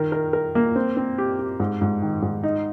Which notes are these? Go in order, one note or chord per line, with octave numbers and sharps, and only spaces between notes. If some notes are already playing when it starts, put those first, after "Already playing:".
Already playing: D#3 A#4
A#4
A#4
A#3
C4
C4
G4
G4
G#2
G#2
D#3
G#2
D#4